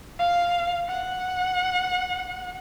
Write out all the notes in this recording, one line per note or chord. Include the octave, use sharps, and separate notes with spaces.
F5
F#5